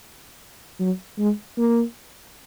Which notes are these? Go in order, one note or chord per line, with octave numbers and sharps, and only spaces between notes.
F#3
G#3
A#3